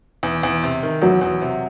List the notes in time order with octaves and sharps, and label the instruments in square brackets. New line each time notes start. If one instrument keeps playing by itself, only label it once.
[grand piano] E2
E2
C3
D#3
[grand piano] E2 [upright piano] F#3
[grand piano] E2
C3